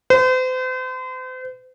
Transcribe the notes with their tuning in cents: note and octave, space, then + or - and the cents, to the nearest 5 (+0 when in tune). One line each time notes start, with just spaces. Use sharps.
C5 -40